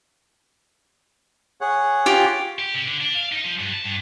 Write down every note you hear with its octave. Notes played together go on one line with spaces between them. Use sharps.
G#4 C#5 F#5
F4 G4
G4
C3
D3
D4
F5
D#4
F3
G2
A5
G2